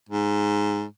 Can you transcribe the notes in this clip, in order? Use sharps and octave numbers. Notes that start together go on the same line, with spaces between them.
G#2